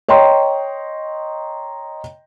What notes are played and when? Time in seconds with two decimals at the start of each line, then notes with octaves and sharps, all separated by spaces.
0.08 C#5 D#5 G5 A#5 C6